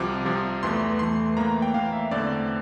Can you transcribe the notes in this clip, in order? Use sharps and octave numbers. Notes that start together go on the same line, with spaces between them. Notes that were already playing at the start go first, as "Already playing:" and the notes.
Already playing: C2 C3 F3 D6
C2 C3 F3
E2 E3 A3 C6
E2 E3 A3 C6
A2 E3 A#3 A#5
G5
A2 E3 A#3 F5
E5
E2 D3 A3 C4 E4 D5